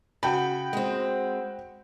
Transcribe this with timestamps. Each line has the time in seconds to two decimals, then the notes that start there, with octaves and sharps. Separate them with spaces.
0.23 C#3 F#4 G5 B5
0.73 G#3 C4